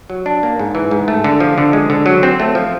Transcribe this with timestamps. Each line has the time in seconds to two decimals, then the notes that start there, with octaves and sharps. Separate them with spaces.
0.10 F#3
0.26 D4
0.43 A#3
0.59 G#2
0.75 E3
0.91 G#2
1.08 A3
1.24 D3
1.40 F3
1.58 D3
1.73 G#3
1.90 D3
2.06 F#3
2.23 C4
2.40 A3
2.55 F3